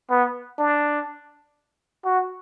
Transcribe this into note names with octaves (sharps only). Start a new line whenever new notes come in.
B3
D4
F#4